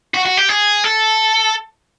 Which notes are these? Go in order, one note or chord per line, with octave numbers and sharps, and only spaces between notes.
F#4
F#4
G4
G#4
A4